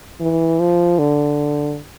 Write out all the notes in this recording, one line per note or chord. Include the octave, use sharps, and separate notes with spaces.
E3
F3
D3